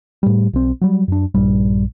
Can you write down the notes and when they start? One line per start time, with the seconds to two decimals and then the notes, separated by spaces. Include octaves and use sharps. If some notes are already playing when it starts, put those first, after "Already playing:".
0.23 A2 G3
0.53 B1 C4
0.81 F#3 G3
1.08 F#2 D4
1.35 A#1 G2 G3